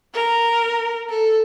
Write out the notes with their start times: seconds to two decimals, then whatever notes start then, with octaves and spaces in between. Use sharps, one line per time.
0.14 A#4
1.09 A4